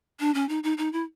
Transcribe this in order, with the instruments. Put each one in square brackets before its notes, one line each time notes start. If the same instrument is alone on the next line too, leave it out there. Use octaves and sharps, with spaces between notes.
[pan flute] D4
C#4
D#4
D#4
D#4
E4